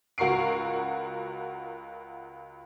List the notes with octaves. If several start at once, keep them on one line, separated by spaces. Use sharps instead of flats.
C#2 F#4 A#4 C#6 C7 D7